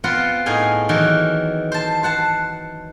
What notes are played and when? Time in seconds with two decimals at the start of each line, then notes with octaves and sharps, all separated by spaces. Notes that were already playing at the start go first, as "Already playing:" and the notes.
0.04 B3 C4 F4 F#5
0.46 A2 D#4 G#4 F5 G#5
0.89 D#3 E3 F#3
1.72 C5 A5
2.03 C5 F#5 A5